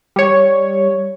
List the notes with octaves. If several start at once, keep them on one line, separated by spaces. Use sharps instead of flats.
G3 C#5